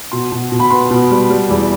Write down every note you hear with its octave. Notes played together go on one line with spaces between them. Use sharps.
B2 C6
B2
B2
B5
B3 C6
B2
G3
G3
E2